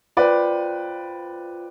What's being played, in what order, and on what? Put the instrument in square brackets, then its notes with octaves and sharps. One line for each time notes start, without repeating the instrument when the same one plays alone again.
[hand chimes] F4 C5 G5 [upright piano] B4 D5